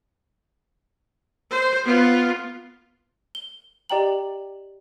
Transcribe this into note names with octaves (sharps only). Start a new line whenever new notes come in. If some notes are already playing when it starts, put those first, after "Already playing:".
C5
B3 F4
G7
G4 D5 D#5 G5 A#5 F#7